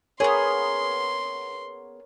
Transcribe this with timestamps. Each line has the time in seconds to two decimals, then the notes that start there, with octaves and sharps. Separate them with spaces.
0.20 B3 G#4 A#4 C#5 C6